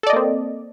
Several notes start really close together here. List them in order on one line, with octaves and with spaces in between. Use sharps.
A4 D5 D#5 A#3 C4